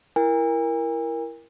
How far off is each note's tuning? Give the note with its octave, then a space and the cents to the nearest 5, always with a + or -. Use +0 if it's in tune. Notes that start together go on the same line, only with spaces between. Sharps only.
E4 +20 A#4 +10 G#5 -45